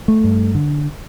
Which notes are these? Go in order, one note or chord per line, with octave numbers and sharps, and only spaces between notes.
A3
G2
D3